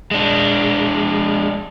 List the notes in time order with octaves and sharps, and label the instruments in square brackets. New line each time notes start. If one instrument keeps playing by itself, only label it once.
[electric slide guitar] G#3 D4